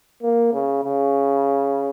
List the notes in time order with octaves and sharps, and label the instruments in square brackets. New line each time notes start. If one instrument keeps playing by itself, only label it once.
[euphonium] A#3
C#3
C#3